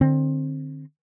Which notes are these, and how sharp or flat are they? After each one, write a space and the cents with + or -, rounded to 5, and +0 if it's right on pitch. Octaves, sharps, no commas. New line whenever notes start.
D3 +35 C4 +15